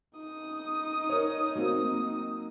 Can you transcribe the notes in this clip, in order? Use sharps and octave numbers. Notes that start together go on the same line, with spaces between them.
D#4 D#6
A#4 C#5
F#3 A#3 C4